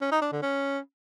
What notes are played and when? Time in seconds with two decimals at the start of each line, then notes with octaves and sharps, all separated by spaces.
0.01 C#4
0.11 D#4
0.22 D4
0.32 D3
0.42 C#4